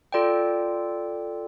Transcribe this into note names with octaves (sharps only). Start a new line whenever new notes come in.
F4 A4 D5 G5